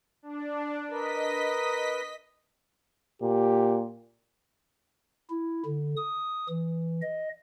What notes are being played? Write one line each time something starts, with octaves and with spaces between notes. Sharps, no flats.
D4
A#4 B4 D#5 B6
A#2 G4
E4
D3
D#6
E3
D#5